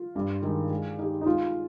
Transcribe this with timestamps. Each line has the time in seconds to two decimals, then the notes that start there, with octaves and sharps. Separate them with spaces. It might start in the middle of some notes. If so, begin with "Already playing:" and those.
Already playing: F4
0.16 G2
0.42 D#3 G#3 D#4
0.70 G#3
0.99 D#4 G4
1.21 D#4
1.25 G#3 F4